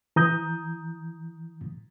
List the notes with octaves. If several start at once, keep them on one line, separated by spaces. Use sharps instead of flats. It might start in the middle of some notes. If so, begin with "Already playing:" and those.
E3 A#5 D#6 G6